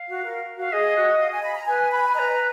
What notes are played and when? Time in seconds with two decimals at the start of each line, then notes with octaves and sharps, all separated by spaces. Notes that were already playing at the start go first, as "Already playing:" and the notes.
Already playing: F5
0.08 F#4
0.23 A#4
0.56 F#4 F5
0.72 G#4 D#5
0.96 F#4
1.19 F5
1.31 G#5
1.43 B5
1.55 A#5
1.66 B4 G#5
1.91 B5
2.04 G#5
2.14 B4 D#5 A#5